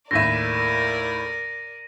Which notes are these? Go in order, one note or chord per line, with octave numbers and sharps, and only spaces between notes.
D#2 A2 A#4 D5 E5 A#6 D#7